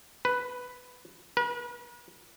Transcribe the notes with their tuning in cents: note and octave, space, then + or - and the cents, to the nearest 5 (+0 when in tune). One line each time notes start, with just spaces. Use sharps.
B4 +5
B4 -45